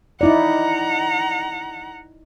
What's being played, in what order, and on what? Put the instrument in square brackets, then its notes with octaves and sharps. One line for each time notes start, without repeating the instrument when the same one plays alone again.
[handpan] D#4 E4 D5 [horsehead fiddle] F#5 A#5